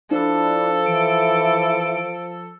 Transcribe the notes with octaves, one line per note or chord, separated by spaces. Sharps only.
F3 D4 E4 A4
E3 D7